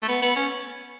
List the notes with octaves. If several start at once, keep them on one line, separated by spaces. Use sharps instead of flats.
A3
B3
B3
C#4